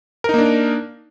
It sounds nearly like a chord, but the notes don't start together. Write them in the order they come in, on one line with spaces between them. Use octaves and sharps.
A#4 D#4 A#3 D4